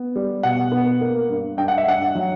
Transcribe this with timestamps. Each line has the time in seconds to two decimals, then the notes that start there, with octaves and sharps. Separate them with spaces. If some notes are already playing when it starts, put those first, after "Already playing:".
Already playing: B3
0.16 G3
0.43 B2 F#5
0.72 B3
1.01 A#3
1.29 G2
1.57 G2 G5
1.68 F#5
1.78 E5
1.87 G2 F#5
2.15 F#3